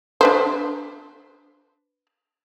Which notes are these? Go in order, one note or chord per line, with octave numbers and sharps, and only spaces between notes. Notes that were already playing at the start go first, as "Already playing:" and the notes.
D4 B4 C5